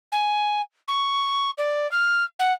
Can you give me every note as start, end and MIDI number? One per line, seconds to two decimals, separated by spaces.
0.12 0.61 80
0.88 1.50 85
1.58 1.89 74
1.91 2.24 89
2.39 2.53 78